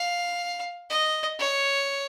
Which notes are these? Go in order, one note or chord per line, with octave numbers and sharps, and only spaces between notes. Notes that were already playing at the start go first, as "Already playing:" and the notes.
Already playing: F5
D#5
C#5